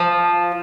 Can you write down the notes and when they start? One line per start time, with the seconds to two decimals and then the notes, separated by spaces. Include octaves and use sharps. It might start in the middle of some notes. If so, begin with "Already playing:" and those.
Already playing: F3